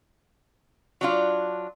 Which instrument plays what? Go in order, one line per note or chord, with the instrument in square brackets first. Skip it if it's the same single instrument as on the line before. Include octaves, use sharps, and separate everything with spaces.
[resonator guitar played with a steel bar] F#3 D4 F4